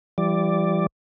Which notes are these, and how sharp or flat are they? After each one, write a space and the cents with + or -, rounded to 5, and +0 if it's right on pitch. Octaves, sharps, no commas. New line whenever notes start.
E3 +40 G3 -5 D5 +0